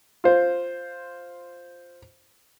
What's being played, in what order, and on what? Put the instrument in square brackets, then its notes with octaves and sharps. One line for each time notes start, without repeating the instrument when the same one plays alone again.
[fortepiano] F4 C5